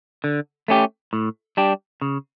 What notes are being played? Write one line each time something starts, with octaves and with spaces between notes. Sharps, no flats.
D3
A3 C#4 G4
A2
G3 D4 G4
C#3